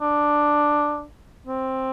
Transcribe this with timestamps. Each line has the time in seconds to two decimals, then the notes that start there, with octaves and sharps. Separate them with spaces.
0.01 D4
1.47 C4